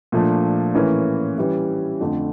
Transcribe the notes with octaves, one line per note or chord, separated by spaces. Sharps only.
A#2 F3 A3 D4
A2 E3 A#3 C#4 E4
E3 G3 C#4
F2 D3 A3